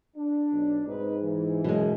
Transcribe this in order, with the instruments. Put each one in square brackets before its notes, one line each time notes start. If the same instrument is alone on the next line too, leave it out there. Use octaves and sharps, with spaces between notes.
[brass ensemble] D4
[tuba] B1
[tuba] G#2 [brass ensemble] C4 D#4 B4
[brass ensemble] E3
[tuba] F#2 [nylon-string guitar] B2 G#3